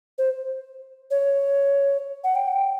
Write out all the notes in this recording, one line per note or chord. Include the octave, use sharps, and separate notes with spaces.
C5
C#5
F#5
G5